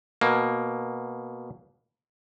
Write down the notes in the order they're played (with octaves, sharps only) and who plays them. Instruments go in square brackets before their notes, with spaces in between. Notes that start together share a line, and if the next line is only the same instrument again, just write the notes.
[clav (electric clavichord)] B2 A#3